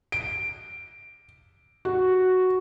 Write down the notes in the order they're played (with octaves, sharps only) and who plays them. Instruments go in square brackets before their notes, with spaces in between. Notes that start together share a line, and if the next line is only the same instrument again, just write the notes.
[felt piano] D7
F#4